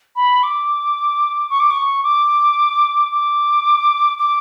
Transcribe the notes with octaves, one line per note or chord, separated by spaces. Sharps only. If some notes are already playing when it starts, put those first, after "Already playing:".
B5
D6
C#6
D6
C#6
D6
D6
D6